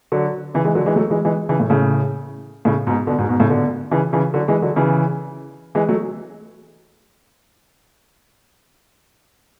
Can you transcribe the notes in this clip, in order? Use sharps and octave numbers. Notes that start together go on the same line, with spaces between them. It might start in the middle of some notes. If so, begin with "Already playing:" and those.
D3 F#3
C#3 E3
E3 G#3
D3 F#3
E3 G#3
F#3 A3
E3 G#3
E3 G#3
C#3 E3
A2
A2 C#3
A2 C#3
G#2 B2
B2 D3
G#2 B2
G#2 B2
A2 C#3
B2 D3
C#3 E3
C#3 E3
D3 F#3
E3 G#3
D3 F#3
C#3 E3
E3 G#3
F#3 A3